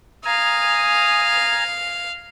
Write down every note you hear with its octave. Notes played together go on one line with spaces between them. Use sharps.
F5 G#5 A#5 D#6